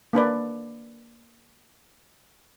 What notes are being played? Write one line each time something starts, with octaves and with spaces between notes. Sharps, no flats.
A#3 D4 B4 D5